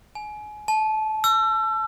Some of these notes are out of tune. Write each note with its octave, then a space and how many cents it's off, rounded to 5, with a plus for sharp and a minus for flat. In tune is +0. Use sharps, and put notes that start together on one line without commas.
G#5 +25
A5 -25
E6 +35